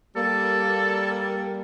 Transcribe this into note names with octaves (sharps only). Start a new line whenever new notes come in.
G3 A#3 A4